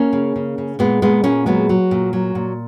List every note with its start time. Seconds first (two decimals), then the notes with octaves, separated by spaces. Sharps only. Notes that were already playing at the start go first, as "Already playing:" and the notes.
Already playing: A#3 C#4
0.13 C#3
0.36 C#3
0.58 C#3
0.79 A#2 G#3 B3
1.02 A#2 G#3 B3
1.24 A#2 A#3 C#4
1.46 F#3 G#3 B3
1.69 F#3
1.91 A#2
2.13 F#3
2.35 A#2